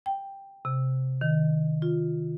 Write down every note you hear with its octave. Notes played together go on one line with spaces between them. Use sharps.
G5
C3
D#3
F4